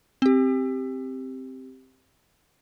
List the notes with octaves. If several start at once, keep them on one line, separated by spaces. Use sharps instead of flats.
C4 G4